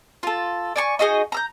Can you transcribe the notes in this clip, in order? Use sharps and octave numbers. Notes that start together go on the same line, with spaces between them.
F4 A4
D5 G#5 C#6
D#4 F#4 G#4 D#5
A#5 E6 G6